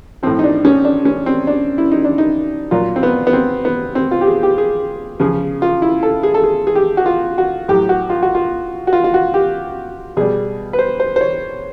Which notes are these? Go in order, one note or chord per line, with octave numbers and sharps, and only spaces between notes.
A2 F3 C4
D#4
D4
C#4
D4
C#4
C4
D4
E4
D#4
D4
D#4
A#2 F#3 F4
C4
B3
B3
C4
B3
C4
F4
G4
G#4
G4
G#4
C#3 F3 G#4
F4
E4
A4
G#4
A4
G#4
G#4
G4
F#4
F4
F#4
A2 F#3 G4
F#4
F4
F#4
F4
F#4
F4
F4
F#4
G4
B2 G3 G#4
B4
C5
C5
C5
C#5